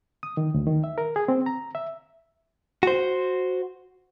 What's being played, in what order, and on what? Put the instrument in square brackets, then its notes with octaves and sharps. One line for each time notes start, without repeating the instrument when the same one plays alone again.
[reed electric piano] D#6
D#3
D2
D#3
E5
A#4
G#4
C4
A#5
E5
[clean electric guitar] F#4 C5